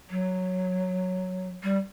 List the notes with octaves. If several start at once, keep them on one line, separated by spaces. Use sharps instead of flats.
F#3
G3